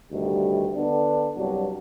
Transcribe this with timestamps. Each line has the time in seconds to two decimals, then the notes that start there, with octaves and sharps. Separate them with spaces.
0.12 D2 G2 C3 D#3 G3
0.75 D3 B3 D4
1.36 C2 G2 F#3 D4 F#4